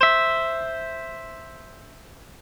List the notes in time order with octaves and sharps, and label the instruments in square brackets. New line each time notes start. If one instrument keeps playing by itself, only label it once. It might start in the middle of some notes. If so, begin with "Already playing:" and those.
[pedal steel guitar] C5 E5